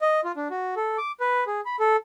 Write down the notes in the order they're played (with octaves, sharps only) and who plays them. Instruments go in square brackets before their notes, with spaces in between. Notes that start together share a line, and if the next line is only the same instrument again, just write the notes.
[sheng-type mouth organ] D#5
F4
D4
F#4
A4
D6
B4
G#4
B5
A4